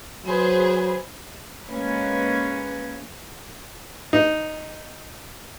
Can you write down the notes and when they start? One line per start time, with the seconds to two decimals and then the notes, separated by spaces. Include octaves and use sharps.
0.24 F#3 G#4 B4 C5
1.68 G#3 A#3 C#4 B4
4.13 D#4